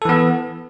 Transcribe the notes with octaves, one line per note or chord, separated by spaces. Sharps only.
E3 B3 A4